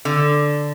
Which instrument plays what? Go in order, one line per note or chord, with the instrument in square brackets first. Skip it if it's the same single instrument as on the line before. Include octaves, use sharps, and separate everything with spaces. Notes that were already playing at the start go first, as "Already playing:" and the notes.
[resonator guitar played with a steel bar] D3